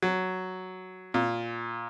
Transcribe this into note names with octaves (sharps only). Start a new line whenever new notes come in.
F#3
A#2